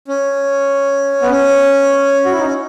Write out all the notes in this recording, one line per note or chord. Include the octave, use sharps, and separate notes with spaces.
C#4
B3
C#4
F#4
E4
D#4
C#4